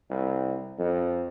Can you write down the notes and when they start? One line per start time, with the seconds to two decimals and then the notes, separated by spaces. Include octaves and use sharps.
0.10 C2
0.79 F2